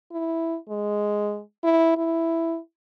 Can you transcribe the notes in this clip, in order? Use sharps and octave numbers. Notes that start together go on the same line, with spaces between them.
E4
G#3
E4
E4